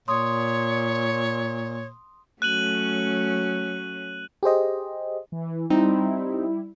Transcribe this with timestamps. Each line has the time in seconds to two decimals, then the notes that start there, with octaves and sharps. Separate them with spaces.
0.08 A#2 C#5 C6 D#6
2.42 F#3 A3 C#4 F#6 D#7 F#7
4.43 G4 G#4 C5 D#5
5.32 E3
5.70 G3 C4 D#4 E4